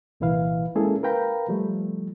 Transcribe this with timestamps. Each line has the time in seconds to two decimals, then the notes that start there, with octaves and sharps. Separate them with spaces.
0.20 C2 A#2 E3 E4 B4 F5
0.75 G#3 A#3 C#4 E4 G#4 A4
1.03 A#4 B4 F5 G5 A#5 B5
1.48 F3 G3 A3